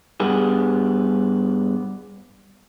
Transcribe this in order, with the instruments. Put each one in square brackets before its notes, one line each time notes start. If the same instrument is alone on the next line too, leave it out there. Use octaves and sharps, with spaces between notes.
[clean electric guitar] G2 B3 G4 G#4